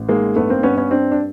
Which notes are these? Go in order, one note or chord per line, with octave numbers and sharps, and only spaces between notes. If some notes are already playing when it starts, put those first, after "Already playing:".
Already playing: A1
D#3 G#3 A#3
G2 A3 B3
A#3 C4
G2 B3 C#4
B3 C#4
G2 C4 D4
D4